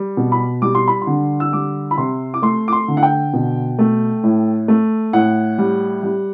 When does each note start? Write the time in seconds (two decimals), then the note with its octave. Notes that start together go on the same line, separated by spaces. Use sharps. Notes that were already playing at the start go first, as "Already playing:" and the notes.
Already playing: G3
0.17 B2
0.32 B5
0.62 G3 D6
0.75 C6
0.88 B5
1.02 C6
1.07 D3
1.40 E6
1.53 G3 D6
1.91 B5
1.98 C3 C6
2.34 D6
2.42 A3 C6
2.68 D6
2.73 C6
2.88 D3
2.97 F#5
3.03 G5
3.33 B2
3.79 A3
4.23 A2
4.68 A3
5.13 A2 F#5
5.58 G3
6.03 G3